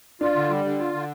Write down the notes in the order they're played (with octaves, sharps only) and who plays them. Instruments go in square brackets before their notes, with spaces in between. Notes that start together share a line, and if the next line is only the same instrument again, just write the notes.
[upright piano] D4 [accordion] F4
[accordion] D3
G3
D3
F4
D3